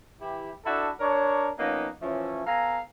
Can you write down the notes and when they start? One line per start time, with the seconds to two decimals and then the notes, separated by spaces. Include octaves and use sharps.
0.20 E3 E4 G4
0.65 D4 E4 F#4 A4
1.00 D4 A#4 C#5
1.58 F3 A#3 B3 C#4 D#4
2.02 E3 F3 A3 C#4
2.46 B3 A4 F5 G#5 A#5